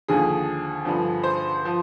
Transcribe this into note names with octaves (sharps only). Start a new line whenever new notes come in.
D#2 D3 F3 G#4
G2 D3 F3
C5
F3